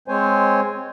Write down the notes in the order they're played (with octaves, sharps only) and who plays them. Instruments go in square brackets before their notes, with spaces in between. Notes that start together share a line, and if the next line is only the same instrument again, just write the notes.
[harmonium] G#3 C4 C5 C#5 G#5